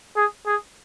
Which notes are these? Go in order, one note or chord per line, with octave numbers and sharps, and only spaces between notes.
G#4
G#4